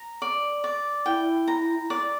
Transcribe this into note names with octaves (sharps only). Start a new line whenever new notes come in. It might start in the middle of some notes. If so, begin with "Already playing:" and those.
Already playing: A#5
D5
D5
E4 G5
A#5
D5